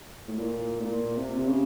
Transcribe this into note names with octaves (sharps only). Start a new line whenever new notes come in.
A2
A#2
A2
A#2
C3
C3
C#3